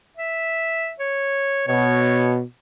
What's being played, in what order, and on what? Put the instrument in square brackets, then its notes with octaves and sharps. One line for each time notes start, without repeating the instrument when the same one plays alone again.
[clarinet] E5
C#5
[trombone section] B2 [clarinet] C#5